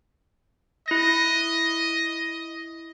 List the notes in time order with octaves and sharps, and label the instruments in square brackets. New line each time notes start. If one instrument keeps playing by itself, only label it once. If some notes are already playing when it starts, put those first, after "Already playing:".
[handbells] E4 A#6 [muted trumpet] D#5